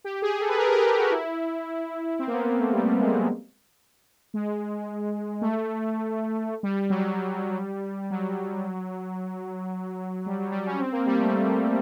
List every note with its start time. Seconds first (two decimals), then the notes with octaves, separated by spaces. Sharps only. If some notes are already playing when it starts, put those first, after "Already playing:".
0.04 G4
0.22 G#4
0.40 A4
0.49 B4
0.58 A#4
0.72 A#4
0.79 G4
0.85 G#4
0.98 F#4
1.11 E4
2.19 C4
2.27 A#3
2.32 B3
2.46 A#3
2.59 A3
2.73 G3
2.87 G3
3.00 G#3
3.13 F#3
4.34 G#3
5.41 A3
6.63 G3
6.90 F#3
7.04 G3
8.11 F#3
10.26 G3
10.40 F#3
10.52 G3
10.66 C#4
10.79 C4
10.92 A#3
11.06 G3
11.19 A3